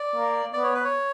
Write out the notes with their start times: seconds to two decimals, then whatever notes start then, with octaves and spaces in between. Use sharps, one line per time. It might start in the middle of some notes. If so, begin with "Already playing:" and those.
Already playing: D5
0.15 A#3
0.53 B3 D5
0.64 C#5
0.74 B4
0.84 C#5